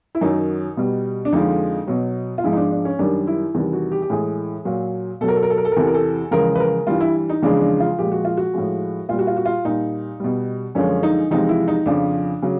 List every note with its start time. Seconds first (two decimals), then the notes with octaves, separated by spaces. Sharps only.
0.15 E4
0.21 F#2 D#3 F#3 D#4
0.77 B2 G3
1.25 D4
1.32 F2 D3 F3 G#3 D#4
1.87 B2 F#3
2.38 F4
2.44 G#2 F3 G#3 E4
2.53 D#4
2.57 D4
2.71 D4
2.85 C#4
2.99 F#2 D#3 G3 D4
3.27 E4
3.54 E2 C3 D#3 G3
3.73 F#4
3.92 G4
4.02 G4
4.10 A2 E3 G#3 G#4
4.65 A#2 F#3
5.21 B2 A4
5.24 F#3 A#4
5.36 A4
5.43 A#4
5.50 A4
5.58 A#4
5.65 A4
5.72 A#4
5.76 E2 C3 E3 A4
5.87 A#4
5.94 A4
6.31 E2 C#3 F3 G#3 A#4
6.55 B4
6.60 A#4
6.87 G2 E3 G3 F4
7.00 E4
7.29 D#4
7.42 E2 C#3 F3 G#3 D4
7.61 D4
7.80 F4
7.99 A#2 F3 G#3 G4
8.12 F#4
8.25 F4
8.37 F#4
8.54 A2 F3 G#3
9.09 A#2 G3 F4
9.19 F#4
9.27 F4
9.37 F#4
9.45 F4
9.65 A#2 G3 D#4
10.20 B2 G3
10.75 F#2 D3 F3 G#3 C#4
11.03 D#4
11.31 E2 C3 F3 G#3 D#4
11.49 E4
11.68 D#4
11.86 F2 C#3 F3 D4
12.42 C#3 F#3